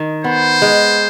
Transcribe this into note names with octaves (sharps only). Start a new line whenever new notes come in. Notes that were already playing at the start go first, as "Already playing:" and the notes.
Already playing: D#3
B3 C5
G#3